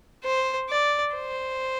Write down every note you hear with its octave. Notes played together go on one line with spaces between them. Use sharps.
C5
D5
C5